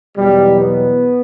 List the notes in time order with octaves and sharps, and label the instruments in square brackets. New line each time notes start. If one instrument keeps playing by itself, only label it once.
[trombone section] E2 B2 F#3 G3
B3